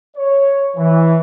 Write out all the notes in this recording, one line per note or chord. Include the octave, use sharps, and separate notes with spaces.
C#5
E3